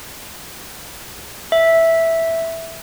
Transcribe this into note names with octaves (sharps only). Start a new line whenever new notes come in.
E5